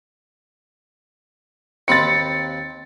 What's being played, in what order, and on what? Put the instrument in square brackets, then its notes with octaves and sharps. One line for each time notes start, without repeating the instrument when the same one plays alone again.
[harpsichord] D#2 C4 B5 [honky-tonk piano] A6 C#7